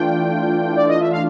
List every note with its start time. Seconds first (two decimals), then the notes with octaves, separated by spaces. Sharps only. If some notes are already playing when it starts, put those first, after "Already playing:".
Already playing: E3 A3 D4 F4 G5
0.76 D5
0.88 D#5
1.00 E5
1.11 F5